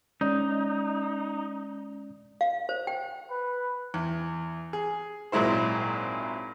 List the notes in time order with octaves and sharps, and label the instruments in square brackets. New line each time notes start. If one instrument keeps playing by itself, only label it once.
[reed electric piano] G#3 C#4 D5 [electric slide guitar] D#4
[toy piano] F5
C5
G5
[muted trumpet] B4
[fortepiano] E2
G#4
G#1 A#2 F#3 G#3 E4 C5